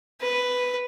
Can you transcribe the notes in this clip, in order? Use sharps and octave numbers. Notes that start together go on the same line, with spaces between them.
B4